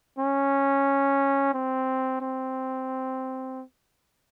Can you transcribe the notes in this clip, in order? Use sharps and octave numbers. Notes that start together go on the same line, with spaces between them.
C#4
C4
C4